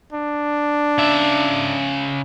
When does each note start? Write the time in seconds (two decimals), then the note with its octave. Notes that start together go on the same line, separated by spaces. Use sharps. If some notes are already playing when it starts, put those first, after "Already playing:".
0.13 D4
0.98 C#3 E5